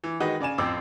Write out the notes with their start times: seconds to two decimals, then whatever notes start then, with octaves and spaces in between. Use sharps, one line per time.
0.04 E3
0.20 D#3 G#3 D#4 F#4 B4 D#6
0.40 C#3 D5 G#5 E7
0.58 A1 F2 C4 D6 E6